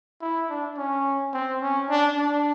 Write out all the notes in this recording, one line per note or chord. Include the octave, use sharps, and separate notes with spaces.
E4
D4
C#4
C4
C#4
D4
D4